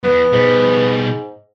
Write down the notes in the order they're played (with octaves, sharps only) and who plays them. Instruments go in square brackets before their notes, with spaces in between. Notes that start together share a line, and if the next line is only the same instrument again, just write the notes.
[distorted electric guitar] E2 G2 [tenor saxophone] B3
[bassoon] G#2 [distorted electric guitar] B2 G3